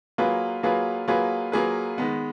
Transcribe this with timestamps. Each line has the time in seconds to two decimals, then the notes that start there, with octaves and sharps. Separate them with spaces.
0.18 F#3 A#3 F4 G#4 B4
0.63 F#3 A#3 F4 G#4 B4
1.08 F#3 A#3 F4 G#4 B4
1.52 F#3 A#3 F4 G#4 B4
1.98 D#3 G#3 B3